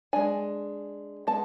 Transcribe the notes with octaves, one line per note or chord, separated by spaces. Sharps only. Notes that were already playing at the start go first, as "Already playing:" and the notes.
G#3 D4 G#5
G#3 B3 A5